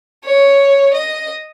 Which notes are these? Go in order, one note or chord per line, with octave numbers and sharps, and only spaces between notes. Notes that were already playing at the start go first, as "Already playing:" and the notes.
C#5
D#5